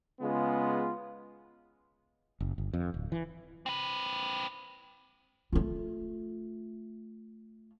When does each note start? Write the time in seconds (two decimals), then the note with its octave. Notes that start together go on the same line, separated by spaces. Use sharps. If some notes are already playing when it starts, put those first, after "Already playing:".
0.21 C#3 G#3 B3 F4
2.40 F#1
2.58 G1
2.73 F2
2.94 D1
3.12 E3
3.66 C4 B4
5.53 A3 F4